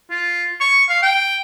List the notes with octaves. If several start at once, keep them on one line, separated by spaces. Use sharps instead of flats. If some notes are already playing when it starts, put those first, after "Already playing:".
F4
C#6
F5
G5